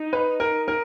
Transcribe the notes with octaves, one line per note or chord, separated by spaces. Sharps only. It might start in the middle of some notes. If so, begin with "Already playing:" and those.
Already playing: D#4
B4
A#4
A#4